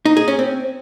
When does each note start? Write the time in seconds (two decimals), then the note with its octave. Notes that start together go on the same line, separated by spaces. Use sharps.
0.06 D#4
0.17 G#4
0.28 C#4
0.39 C4